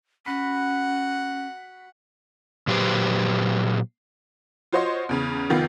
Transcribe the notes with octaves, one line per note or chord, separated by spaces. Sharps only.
C#4 F#4 F#5 B5
A#2 F#3 G4 B4 C5
F4 F#4 C5 C#5 D#5 C6
E2 C#3
F1 D#3 B3 F4